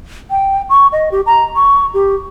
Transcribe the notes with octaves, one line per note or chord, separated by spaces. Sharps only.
G5
C#6
D#5
G4
A#5
C#6
G4